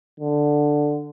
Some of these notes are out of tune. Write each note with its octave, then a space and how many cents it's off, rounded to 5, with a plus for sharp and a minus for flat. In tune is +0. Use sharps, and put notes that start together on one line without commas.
D3 +5